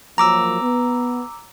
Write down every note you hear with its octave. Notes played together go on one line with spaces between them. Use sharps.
F3 F#3 A#3 A#5 D6 E6
B3